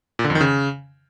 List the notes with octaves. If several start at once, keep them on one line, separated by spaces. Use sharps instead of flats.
A#2
D3
F2
D#3
C#3